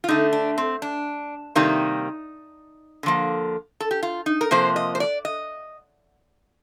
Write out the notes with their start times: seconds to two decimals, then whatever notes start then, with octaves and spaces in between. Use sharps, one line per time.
0.04 F4
0.08 D3 A3 D#4
0.33 D4
0.58 C4
0.82 D4
1.55 C3 D#3 G3 A#3 D#4
3.03 D3 F3 A#3
3.80 A4
3.91 G4
4.03 F4
4.26 D#4
4.41 A#4
4.51 C3 F3 A#3 C5
4.76 D#5
4.95 C5
5.00 D5
5.25 D#5